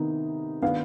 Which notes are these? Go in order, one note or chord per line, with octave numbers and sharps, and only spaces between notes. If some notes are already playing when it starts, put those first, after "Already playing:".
Already playing: C3 D#3 B3 D#4
D#3 B3 D4 F5